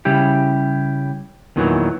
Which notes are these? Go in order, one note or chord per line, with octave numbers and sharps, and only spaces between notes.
C#3 G3 E4 G4
E2 A#2 D#3 E3 F#3